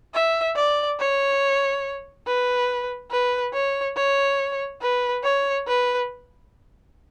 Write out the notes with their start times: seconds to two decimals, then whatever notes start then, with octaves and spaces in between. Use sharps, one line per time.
0.14 E5
0.56 D5
0.99 C#5
2.26 B4
3.11 B4
3.53 C#5
3.96 C#5
4.82 B4
5.23 C#5
5.67 B4